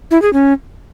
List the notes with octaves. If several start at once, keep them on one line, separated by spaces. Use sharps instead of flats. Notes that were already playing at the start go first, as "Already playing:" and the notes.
E4
G#4
C#4